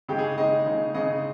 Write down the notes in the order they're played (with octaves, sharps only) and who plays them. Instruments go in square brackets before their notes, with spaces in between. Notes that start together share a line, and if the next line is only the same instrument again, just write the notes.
[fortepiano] C#3 G#3 D#4 G4
G#4
C#3 G#3 D#4 D#5
C#3 G#3 D#4
C#3 G#3 D#4 D#5